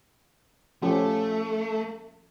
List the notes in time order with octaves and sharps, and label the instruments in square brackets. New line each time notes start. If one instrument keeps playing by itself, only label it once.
[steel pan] F3 C#4 G4 [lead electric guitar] A3